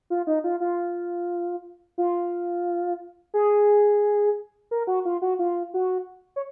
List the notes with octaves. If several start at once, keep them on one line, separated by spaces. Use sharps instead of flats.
F4
D#4
F4
F4
F4
G#4
A#4
F#4
F4
F#4
F4
F#4
C#5